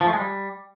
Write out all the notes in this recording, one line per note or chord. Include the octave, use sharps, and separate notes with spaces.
F3
A3
G#3
G3